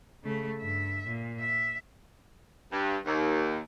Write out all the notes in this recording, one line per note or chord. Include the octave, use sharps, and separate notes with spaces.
C#3 A3
G2 E5
A#2
E5
G2
D#2